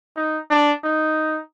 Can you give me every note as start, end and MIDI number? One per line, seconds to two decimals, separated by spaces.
0.16 0.39 63
0.51 0.72 62
0.84 1.41 63